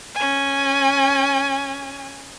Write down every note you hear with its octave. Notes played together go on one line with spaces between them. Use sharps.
C#4 G#5